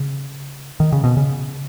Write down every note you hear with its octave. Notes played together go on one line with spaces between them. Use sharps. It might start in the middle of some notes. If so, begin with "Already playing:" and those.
Already playing: C#3
D#3
C#3
B2
C#3